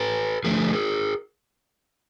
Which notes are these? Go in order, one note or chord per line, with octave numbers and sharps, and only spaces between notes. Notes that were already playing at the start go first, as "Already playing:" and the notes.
Already playing: A4 B4
D3 F3 A3 G#4 A#4